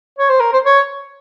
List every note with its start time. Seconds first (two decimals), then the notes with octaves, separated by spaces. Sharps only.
0.19 C#5
0.29 C5
0.40 A#4
0.53 C5
0.66 C#5